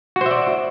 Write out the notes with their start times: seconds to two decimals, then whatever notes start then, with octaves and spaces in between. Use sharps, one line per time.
0.16 F#4
0.21 C5
0.26 E5
0.31 D5